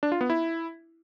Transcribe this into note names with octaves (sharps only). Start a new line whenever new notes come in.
D4
F4
B3
E4